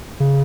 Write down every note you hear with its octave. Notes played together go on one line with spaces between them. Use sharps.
C#3